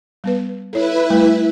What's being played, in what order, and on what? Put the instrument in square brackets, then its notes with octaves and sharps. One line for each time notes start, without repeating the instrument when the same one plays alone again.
[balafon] G3 B3 B4
[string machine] E4 B4 [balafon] A4 C#5
[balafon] G3 A3